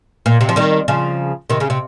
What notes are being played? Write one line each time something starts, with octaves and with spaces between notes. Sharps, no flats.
A#2
C3
F3
D#3 G3
C#3 F3
C3 D#3
C#3
C3